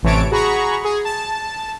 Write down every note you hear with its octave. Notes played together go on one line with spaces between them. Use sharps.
A1 C3 E3 C#5 A5 D7
F#4 G#4 A#5 B5 C#6
G#4
A5